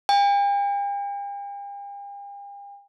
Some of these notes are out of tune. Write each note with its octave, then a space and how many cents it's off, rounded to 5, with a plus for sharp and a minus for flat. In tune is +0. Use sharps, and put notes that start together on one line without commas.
G5 +45